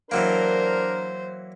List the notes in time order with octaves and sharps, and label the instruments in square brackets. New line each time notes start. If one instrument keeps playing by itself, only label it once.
[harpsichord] E3 F#3 A#3 [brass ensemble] D4 A#4 [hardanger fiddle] C5